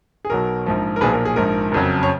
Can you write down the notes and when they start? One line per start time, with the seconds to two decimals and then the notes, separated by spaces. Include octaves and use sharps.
0.25 G#4
0.30 B1 B2 F#3 A#4
0.66 A#1 G#2 F3
0.96 A#4
1.01 B1 A#2 F3 G#4 B4
1.13 A#4
1.25 G#4
1.36 A#1 G#2 F3 A#4
1.72 F#1 F2 C#3 F#3
2.03 C#5